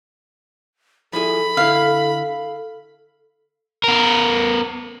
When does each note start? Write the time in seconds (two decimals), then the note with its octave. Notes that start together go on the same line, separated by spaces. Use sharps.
1.13 F3 E4 G#4 A4 B5
1.57 D3 E4 F5
3.84 B3 A#4